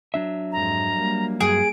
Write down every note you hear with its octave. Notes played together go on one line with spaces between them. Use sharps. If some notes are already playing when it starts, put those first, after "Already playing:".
F#3 D4 E5
F2 G#2 A#5
G3 A#3
G2 F#3 G#4 D7